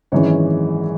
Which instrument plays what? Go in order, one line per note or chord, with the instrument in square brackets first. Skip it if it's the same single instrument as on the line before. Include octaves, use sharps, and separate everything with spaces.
[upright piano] G#1 F#2 E3 G#3 C#5